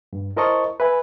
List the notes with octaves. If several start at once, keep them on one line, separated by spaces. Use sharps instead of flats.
G2
E4 A#4 C5 D#5 A5 C#6
B4 E5 G#5